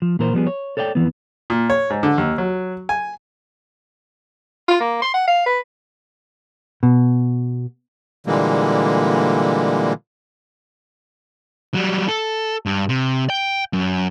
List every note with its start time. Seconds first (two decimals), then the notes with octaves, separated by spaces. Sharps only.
0.02 F3
0.19 A#2 E3 A#4 C5
0.34 F3 G3 B3 G#4
0.47 C#5
0.77 A4 C#5 D5 E5 G5
0.95 F2 D#3 E3 B3
1.50 A#2
1.70 C#5
1.90 G#2
2.03 D3
2.18 D#2
2.38 F#3
2.89 G#5
4.68 F4
4.80 A#3
5.02 C6
5.14 F#5
5.28 F5
5.46 B4
6.83 B2
8.27 A#2 D3 E3 G3 G#3 A#3
11.74 F#3 G3
12.08 A4
12.66 G2
12.89 C3
13.30 G5
13.73 F#2